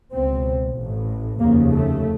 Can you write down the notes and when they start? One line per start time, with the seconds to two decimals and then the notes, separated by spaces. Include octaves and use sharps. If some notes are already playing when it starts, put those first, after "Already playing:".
0.13 C#2 B2 C4
0.76 A1 A2
1.40 F1 D#2 C#3 A#3
1.72 A3